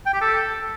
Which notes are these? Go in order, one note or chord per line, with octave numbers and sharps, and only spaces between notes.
G5
G4
A4